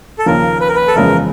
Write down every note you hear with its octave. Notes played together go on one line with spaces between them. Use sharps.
A4
D#2 C#3 F3 A#4
B4
A#4
B4
A4
F#1 E2 C#3 F3 G#3 A#4